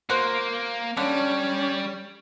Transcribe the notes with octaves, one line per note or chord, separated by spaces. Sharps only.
A#3 F#4 C5
D3 G3 C#4